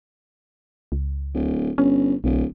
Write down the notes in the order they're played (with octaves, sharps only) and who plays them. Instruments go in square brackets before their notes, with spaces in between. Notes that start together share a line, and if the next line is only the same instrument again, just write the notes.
[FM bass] C#2
[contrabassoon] D1
[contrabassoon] G1 [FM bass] C#4
[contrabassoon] D1 [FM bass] B1